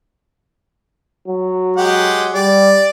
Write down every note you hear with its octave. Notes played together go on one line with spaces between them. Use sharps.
F#3
G#3 G4 F#5
G3 D5